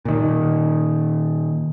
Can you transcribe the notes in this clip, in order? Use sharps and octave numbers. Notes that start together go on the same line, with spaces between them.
A#2 D#3